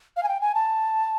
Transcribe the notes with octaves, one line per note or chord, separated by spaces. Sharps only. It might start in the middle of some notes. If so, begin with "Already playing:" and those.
F5
G#5
G5
G#5
A5